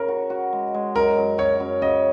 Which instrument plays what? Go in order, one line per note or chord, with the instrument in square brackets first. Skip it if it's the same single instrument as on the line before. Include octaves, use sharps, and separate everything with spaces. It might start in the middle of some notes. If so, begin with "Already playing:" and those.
Already playing: [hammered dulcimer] C#3 [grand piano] A#4
[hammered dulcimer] F#4
F#4
G#3
G#3
[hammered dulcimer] F#2 [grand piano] A#4
[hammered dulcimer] F#2
[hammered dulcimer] F#2 [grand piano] C#5
[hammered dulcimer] F#2
[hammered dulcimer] C#3 [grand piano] D#5